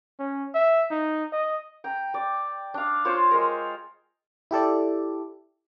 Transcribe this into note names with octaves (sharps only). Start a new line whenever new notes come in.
C#4
E5
D#4
D#5
G5 A#5
D5
D4 F5
F4 C5 C#5 D6
G#3 A#4
E4 G4 A4 D5